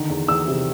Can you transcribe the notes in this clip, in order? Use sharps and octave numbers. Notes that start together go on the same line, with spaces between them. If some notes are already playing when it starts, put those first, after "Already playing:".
Already playing: D3 D#3
E2
E2 E6
C3